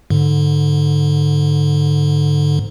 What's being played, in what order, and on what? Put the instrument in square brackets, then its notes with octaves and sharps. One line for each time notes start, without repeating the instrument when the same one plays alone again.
[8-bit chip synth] G#2 D3